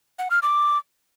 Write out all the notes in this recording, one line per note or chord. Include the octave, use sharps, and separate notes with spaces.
F#5
F6
D6